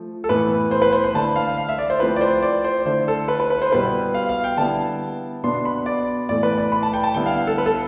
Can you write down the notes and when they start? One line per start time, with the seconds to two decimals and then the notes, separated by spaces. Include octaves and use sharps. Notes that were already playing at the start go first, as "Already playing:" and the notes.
Already playing: F3 A3
0.24 A4
0.29 A2 E3 B3 B4
0.71 C5
0.82 B4
0.93 C5
1.04 B5
1.14 D3 A3 E4 A5
1.36 F5
1.57 F5
1.69 E5
1.78 D5
1.90 C5
2.00 F3 A3 C4 E4 B4
2.16 D5
2.21 C5
2.43 D5
2.64 C5
2.85 D3 A3 E4 C5
3.08 A4
3.28 B4
3.40 B4
3.50 B4
3.62 C5
3.72 B2 G3 B3 E4 B4
4.14 F5
4.29 F5
4.44 G5
4.57 D3 G3 B3 E4 A5
5.43 B2 B3 D4 C6
5.65 B5
5.86 D5
6.29 A2 E3 A3 D5
6.43 B4
6.58 D5
6.72 B5
6.83 A5
6.93 G5
7.04 A5
7.14 D3 G3 B3 E4 G5
7.26 F5
7.47 A4
7.58 B4
7.66 A4